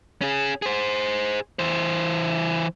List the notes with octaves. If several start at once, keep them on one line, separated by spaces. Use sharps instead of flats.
C#4 G#4
G#4 C5
E3 C5